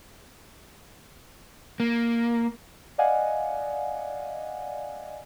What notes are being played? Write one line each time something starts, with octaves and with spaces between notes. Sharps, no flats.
A#3
D5 D#5 F5 F#5 G#5